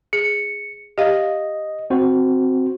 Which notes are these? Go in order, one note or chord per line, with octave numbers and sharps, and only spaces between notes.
G#4 C#7
G4 D#5 F5
C4 F#4 C5